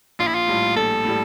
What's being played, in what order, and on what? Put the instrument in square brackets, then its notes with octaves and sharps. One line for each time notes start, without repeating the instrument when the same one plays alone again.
[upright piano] A#1 [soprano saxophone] F4
[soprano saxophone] E4
F4
[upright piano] A2 G3
[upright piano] A#1 [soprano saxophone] A4
[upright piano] A2 G3